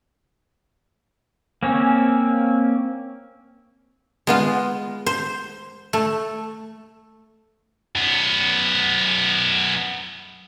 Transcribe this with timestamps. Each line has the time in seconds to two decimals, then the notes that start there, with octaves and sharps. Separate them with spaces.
1.63 A#3 C4 C#4
4.27 G#3 B3 F4
5.06 C5
5.93 A3
7.95 F#2 B3